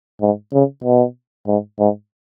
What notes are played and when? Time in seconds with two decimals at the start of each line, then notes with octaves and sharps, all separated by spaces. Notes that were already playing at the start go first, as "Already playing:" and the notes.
0.21 G#2
0.53 C#3
0.84 B2
1.47 G#2
1.79 G#2